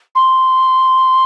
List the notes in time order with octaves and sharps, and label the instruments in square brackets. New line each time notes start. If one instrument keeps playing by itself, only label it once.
[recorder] C6